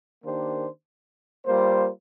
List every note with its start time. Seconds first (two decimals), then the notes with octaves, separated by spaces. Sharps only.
0.24 D#3 A#3 D4 G4 C5
1.46 G3 A#3 F4 C5